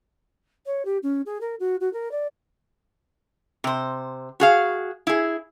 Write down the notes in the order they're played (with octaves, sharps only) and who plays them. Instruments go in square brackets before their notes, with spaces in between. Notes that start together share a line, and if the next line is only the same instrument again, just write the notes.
[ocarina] C#5
G4
C#4
G#4
A#4
F#4
F#4
A#4
D5
[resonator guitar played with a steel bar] C3 C5
F#4 G#4 F5
E4 G#4